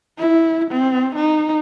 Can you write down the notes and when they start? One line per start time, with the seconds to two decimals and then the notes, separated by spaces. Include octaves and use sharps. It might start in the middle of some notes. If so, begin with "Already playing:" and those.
0.18 E4
0.71 C4
1.16 D#4